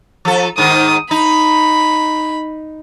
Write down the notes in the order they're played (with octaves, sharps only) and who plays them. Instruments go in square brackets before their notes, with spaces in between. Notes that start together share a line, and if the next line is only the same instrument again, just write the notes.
[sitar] F3 A4
[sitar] G#2 D#3 [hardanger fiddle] D#6
[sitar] D#4 [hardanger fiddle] B5